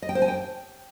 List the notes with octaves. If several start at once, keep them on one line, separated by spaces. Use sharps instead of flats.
D#5
G5
C5
G#5
G5